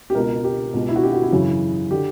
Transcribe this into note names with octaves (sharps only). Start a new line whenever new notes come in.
G4
C#2 B2 A#4
G4
C#2 B2
E4
F#4
G4
F#4
E4
F#2 C#3 E3
D3 G4